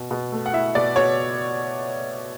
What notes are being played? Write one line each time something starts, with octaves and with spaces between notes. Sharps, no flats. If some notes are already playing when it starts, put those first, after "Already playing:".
Already playing: B2
B2
A3
F#5
E4 E5
B2 D5
B2 C#5